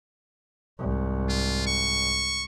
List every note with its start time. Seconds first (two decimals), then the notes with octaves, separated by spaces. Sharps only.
0.79 C2 G#2
1.29 F4
1.67 C#6